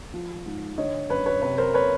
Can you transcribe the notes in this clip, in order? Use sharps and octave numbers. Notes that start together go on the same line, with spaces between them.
F3
G#2
D3 C#5 D#5
F#2 B4 C#5
B4 C#5
C3 B4 C#5
A#4 C5
B4 C#5